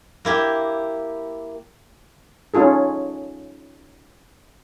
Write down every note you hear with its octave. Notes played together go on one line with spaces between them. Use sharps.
A#3 E4 G4
C#4 D#4 F4 G#4 A4